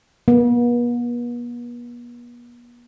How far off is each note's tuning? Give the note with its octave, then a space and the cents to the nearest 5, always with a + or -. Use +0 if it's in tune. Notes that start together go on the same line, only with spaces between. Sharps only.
B3 -45